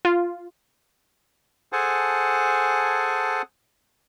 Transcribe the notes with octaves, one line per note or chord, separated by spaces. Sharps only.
F4
G#4 A4 C5 F#5 G#5 A5